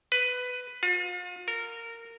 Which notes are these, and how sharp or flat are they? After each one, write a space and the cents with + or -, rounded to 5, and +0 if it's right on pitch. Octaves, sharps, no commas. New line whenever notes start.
B4 +10
F4 +40
A#4 -15